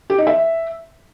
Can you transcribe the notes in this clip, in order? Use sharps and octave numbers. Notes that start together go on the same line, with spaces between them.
G4
D#4
E5